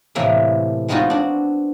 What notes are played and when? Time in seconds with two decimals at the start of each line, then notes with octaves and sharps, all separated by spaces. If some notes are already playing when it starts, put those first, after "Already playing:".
0.15 A2 C3 E3 A#3 E4
0.88 G#3 B3 C4 D#4 F4 F#4
1.10 D4 F#4